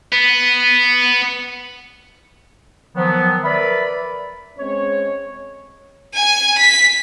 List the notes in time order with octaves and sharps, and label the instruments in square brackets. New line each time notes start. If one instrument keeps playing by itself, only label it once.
[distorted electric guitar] B3
[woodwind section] D#3 F3 F#3 B3
A#4 B4 D5 E5 B5
[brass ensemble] G#3 C4 C#4 C#5
[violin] G#5
B6